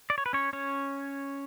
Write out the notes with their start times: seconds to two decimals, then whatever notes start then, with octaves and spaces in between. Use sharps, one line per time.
0.10 D5
0.18 C#5
0.26 B4
0.33 C#4 C#5
0.53 C#4 C#5